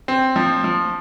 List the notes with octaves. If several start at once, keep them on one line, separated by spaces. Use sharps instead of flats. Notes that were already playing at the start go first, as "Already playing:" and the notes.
C4
F3
F3